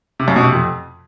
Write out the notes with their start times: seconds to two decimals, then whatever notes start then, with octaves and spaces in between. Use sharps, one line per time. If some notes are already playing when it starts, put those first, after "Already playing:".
0.19 C3
0.28 F#2
0.36 B2
0.44 C3
0.53 F2